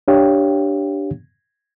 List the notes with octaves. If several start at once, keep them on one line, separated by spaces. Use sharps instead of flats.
D4 G4 C#5 F5 G5